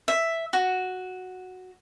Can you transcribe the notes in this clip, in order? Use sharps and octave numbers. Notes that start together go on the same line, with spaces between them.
E5
F#4